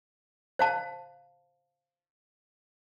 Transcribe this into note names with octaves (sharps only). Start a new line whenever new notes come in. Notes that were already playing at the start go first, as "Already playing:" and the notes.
C5 F5 A5